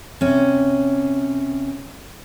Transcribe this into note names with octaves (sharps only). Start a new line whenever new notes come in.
C3 C#4